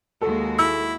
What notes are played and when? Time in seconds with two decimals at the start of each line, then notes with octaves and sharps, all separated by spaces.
0.21 D#2 G#3 F#4 A4
0.59 E4 E6